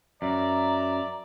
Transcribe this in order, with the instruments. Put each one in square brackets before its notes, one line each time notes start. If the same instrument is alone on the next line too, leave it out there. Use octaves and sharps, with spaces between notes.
[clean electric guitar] F#2 [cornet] D5 [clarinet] E5 [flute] A#5